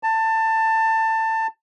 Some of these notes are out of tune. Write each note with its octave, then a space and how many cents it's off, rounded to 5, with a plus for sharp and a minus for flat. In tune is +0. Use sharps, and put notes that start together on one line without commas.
A5 +20